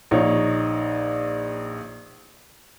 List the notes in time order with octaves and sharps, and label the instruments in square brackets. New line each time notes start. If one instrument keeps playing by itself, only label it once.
[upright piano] A#1 D#4 C#5